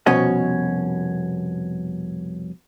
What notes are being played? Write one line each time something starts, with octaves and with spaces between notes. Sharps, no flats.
C2 F2 B2 C#4 F#4 D#5